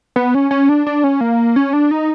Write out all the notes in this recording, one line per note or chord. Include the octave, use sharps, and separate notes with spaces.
B3
C#4
C#4
D4
D4
C#4
A#3
C#4
D4
D#4